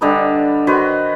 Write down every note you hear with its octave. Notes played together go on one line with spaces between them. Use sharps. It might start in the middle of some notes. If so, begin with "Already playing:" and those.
D3 G3 D#4 B4
D#3 F#4 B4 C5